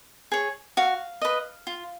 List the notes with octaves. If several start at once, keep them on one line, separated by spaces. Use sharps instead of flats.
G#4 C#5
F#4 F5
B4 D#5
F4